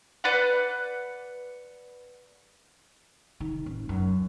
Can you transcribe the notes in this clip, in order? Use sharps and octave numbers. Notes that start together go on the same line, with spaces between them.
B4 D5 F#5
D#3
A1
F#2